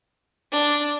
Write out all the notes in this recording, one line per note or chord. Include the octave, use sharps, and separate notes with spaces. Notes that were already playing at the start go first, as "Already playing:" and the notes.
D4